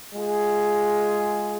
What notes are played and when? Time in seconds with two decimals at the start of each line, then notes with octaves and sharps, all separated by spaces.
0.13 G#3 F4 G#4